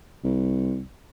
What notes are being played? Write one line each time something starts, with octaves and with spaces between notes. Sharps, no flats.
C2